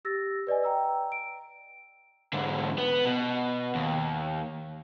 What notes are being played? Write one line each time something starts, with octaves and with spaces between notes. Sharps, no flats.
G4 E6 A6 A#6
B4 D5 D#5 G#5
G5 A#5 E6
D7
G#2 D3
B3
B2
D#2